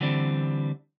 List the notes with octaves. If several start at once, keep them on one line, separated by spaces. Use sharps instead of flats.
D3 E3 G3 C4 D4